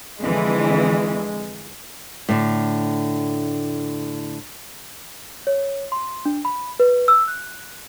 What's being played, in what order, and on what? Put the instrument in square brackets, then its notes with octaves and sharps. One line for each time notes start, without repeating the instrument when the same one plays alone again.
[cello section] F2 D3 E3 [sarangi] G#3
[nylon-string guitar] A2 D3
[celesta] C#5
C6
D4
B5
B4
E6
F#6